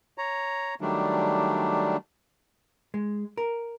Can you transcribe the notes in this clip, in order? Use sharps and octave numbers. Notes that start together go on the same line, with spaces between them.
C#5 A#5
D#3 F#3 G3 A3 D4
G#3
A#4